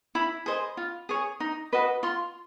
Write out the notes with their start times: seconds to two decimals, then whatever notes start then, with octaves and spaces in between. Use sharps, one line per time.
0.15 E4 B5
0.46 G#4 C5 D#5
0.77 F4
1.09 G#4 C#5
1.40 D#4
1.73 F#4 B4 D#5
2.03 F4 C6